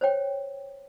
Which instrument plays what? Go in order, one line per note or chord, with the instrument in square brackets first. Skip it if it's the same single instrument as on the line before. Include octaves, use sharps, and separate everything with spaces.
[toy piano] C5 C#5 G5